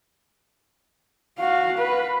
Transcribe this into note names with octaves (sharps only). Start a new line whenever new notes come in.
F#4 F5
B4